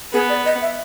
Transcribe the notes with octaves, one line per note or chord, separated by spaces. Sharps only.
B3 G#4
D5
D#5
E5